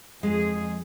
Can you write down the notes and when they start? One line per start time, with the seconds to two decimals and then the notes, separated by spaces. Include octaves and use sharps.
0.23 F2 F3 G#3 G#4